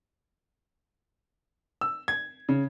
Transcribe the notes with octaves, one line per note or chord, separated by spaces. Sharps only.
E6
G#6
C#3